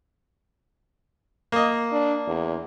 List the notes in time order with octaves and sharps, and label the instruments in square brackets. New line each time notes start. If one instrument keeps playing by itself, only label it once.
[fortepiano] A#3 D#5
[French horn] D4
E2